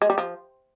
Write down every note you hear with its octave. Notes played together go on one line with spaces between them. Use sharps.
G#3
G3
F3